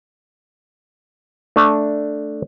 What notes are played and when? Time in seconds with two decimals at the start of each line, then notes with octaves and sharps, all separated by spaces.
1.56 A3 D4